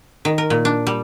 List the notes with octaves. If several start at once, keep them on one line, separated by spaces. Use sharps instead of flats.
D#3
A#4
A#2
D4
G3